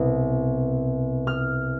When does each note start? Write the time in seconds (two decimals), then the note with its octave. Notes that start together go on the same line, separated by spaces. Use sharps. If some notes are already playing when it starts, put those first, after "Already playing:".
Already playing: C2 B2 B3
1.27 F6